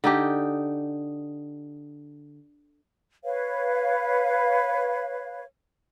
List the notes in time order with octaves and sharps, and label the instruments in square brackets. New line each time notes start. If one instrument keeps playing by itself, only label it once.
[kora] D3 D#4 G4
[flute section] B4 C#5 F5